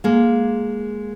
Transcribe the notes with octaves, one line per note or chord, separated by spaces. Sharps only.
G#3 A#3